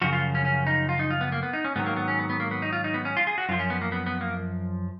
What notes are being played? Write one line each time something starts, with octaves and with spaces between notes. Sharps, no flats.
F#2 C#3 F3 F#4
F4
C#4
C#4
D#4
F4
D#4
F4
B3
A#3
B3
D#4
C#4
G#2 D#3 F#3 B3
A#3
B3
C#4
B3
B3
A#3
B3
D#4
F4
D#4
B3
C#4
F4
G#4
F#4
F#2 F3 F4
C#4
B3
A#3
B3
B3
A#3